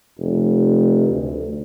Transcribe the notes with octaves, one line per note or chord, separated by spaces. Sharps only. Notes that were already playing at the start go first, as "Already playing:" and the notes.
F1
D2